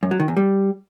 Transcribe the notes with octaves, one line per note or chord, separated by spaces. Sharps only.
F#2
F#3
D#3
E2
G3